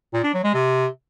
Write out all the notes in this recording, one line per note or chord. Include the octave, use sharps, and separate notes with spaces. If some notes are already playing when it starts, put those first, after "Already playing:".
A#2
D4
F#3
G#3
C3